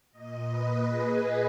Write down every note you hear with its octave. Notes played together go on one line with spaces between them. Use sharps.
A#2 D#5
B4
G#4